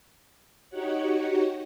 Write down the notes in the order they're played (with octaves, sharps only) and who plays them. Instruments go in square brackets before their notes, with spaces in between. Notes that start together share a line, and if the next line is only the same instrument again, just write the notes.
[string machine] D#4 F#4 G4 C#5 F#5